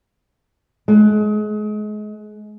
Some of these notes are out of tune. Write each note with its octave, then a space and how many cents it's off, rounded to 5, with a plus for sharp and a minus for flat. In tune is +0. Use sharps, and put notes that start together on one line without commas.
G#3 +30